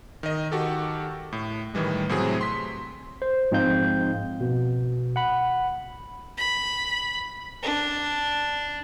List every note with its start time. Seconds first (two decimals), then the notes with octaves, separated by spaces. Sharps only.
0.23 D#3 D#5
0.52 D#3 F#4 G4 A4
1.32 A2
1.74 A2 D#3 E3 G3 G#3
2.09 A2 C3 F#3 A3 C4 G#4
2.41 C6 B6
3.22 C5
3.52 G#2 F3 C4 D#4 F5 G6
4.40 B2
5.16 F#5 B5
6.37 B5
7.63 D4